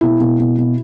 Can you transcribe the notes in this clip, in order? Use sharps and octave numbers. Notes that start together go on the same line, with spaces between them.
B2 E4
B2
B2
B2